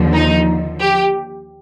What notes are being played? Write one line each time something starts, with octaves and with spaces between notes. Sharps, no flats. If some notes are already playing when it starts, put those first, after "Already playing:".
Already playing: D#2 D3 F3
D#4
G4